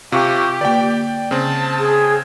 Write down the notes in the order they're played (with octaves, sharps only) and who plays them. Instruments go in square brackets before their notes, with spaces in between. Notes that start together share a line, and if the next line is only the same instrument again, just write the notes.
[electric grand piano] C3 F5 C#6 [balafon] F4 [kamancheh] G4
[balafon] D3 A#3 [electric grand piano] D5 G5
[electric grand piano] C#3 C4 [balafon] C5 [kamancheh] A5
[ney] G#4